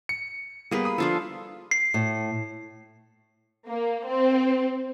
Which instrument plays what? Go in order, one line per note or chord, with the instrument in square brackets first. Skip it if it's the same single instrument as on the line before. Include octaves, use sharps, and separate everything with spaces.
[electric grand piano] C#7
[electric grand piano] G3 B3 [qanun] A#3 G#4 B4
[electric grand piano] B5 D#6
[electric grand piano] F3 [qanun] D4 F4 A4
[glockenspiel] C7
[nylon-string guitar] A2
[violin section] A#3
C4